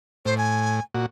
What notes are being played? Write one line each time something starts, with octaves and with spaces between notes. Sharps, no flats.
A2 C5
G#5
A#2 F#4